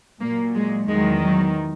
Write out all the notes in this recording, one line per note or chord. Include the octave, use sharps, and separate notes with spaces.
A#2 F#3 A#3
G#3
E2 D#3 F#3 G#3
F#3